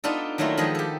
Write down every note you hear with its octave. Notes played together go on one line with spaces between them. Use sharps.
B3 D4 D#4 F4 A4
D#3 F#3 A3 A#3 E4 F4
D#3 F3 G#3 B3 G#4
G4 A4